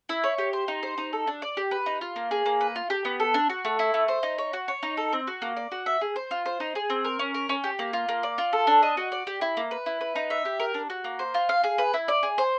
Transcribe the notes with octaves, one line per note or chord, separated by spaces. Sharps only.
E4
C#5
G4
C5
D#4
C5
D#4
A4
D4
D5
G4
B4
D#4
F4
A#3
G#4
A#3
B4
F4
G4
B3
A4
D4
F#4
A3
E4
A3
C5
D#4
C#5
F#4
C#5
D#4
A4
C4
F#4
A#3
D5
F#4
E5
G#4
C5
F4
C5
D#4
G#4
C4
A#4
C#4
A#4
C#4
G4
A#3
F4
A#3
D5
F4
A4
D4
D#5
F#4
D5
G4
E4
A#3
B4
E4
B4
D#4
E5
G4
A#4
D4
F#4
A#3
C5
F4
F5
G#4
B4
E4
D5
G#4
C5